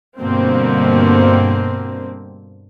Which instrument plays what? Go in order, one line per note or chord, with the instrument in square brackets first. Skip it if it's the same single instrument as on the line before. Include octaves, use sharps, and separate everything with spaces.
[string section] G2 B2 D3 A#3 C4